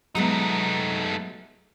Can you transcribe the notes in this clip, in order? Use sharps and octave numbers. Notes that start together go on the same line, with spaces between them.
F#3 G#3 A3 B3 D#4